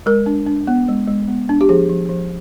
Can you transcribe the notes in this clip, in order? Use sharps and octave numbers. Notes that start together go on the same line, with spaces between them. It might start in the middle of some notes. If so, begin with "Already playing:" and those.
G#3 A#4
D4
D4
B3
G#3
G#3
B3
D4
G4
F3 G#4
F3
F3